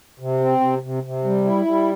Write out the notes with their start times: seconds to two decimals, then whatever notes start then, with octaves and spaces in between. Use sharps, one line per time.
0.20 C3
0.40 C4
0.61 C3
0.83 C3
1.03 C3
1.24 G3
1.45 E4
1.65 G3